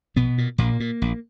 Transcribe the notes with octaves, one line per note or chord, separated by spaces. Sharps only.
A#1 B2 B3
A#2
A#1 A#2 A#3
A#2
A#1